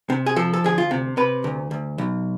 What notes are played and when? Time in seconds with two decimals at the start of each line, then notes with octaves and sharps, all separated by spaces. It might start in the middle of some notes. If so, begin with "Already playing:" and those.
0.10 C3
0.26 G#4
0.36 F3 A4
0.54 A4
0.64 D2 G#4
0.78 F4
0.91 C3
1.17 C3 B4
1.44 D2
1.71 D2
1.98 B1